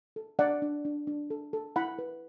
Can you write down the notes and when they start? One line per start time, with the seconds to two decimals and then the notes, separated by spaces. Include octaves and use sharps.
0.16 A4
0.39 D4 D5 F#5
0.62 D4
0.85 D4
1.07 D4
1.30 A4
1.53 A4
1.76 E4 F#5 B5
1.99 B4